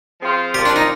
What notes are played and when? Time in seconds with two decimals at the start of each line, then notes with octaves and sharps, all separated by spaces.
0.21 F3 C4 F4 G#4 C5
0.54 F3 C4 F4 G4 A#4 D5
0.66 D4
0.76 D#4